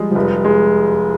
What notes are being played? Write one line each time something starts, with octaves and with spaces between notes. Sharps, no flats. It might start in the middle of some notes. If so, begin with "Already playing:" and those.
Already playing: F3 G3 G#3
F3
F1 G3
G#3